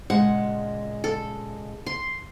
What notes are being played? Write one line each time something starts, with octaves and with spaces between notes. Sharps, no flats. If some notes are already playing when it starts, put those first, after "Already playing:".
A#2 C#3 G#3 F#5
A4
C6